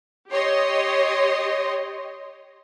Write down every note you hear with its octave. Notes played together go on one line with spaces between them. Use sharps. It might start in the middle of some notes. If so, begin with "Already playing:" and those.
G4 C#5 D#5 C6